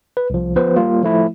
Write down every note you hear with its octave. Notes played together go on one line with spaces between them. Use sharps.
B4
C2 F3
F3 B3 B4 C5
G3 A#3 F4
F3 A3 E4